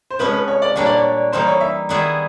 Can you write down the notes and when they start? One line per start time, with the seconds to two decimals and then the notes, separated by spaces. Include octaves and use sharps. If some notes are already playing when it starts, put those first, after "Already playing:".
0.10 C5
0.19 C3 F3 G#3 C#4 B4
0.33 B4
0.48 C#5
0.62 D5
0.76 A#2 G3 A#3 D4 G4 C#5
0.86 D5
0.97 C#5
1.32 E3 G3 A#3 D#4 C5
1.47 C#5
1.61 E5
1.89 D#3 G3 B3 E4 G#4